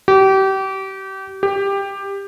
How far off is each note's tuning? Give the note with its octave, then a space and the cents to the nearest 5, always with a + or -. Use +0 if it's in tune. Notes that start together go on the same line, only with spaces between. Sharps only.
G4 -30
G4 +15